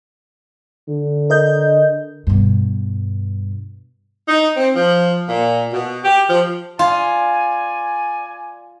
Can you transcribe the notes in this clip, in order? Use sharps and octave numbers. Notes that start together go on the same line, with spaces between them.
D3
A#4 D#5 G6
G2 B2
D#4
C4
F3
A#2
B2
G4
F3
F4 D5 G#5